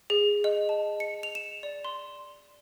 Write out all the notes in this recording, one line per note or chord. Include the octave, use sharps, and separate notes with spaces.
G#4
D#5
A5
C#7
F7
E7
D5
C6